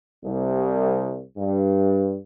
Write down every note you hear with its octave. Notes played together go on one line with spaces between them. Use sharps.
C2
G2